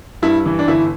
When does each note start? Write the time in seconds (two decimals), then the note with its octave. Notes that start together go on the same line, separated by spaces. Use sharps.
0.22 G2 E4
0.46 E3
0.59 D4
0.68 G1 E4